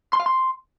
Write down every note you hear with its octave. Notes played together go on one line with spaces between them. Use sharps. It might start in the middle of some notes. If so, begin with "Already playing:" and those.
C6
F5
C6